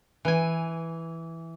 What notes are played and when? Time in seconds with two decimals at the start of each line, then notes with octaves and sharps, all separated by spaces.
0.25 E3 G#5